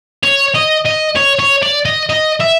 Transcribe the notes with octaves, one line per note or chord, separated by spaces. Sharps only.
C#5
D#5
D#5
C#5
C#5
D5
D#5
D#5
E5